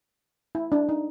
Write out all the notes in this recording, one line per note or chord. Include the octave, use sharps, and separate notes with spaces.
E4
D4
D#4